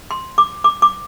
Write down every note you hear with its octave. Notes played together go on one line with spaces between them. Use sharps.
C6
D6
D6
D6